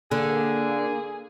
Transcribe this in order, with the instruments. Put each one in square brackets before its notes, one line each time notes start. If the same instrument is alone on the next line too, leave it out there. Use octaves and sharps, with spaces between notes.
[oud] D3 [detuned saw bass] A#3 [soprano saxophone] G#4